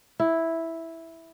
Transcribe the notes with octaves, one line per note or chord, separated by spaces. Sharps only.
E4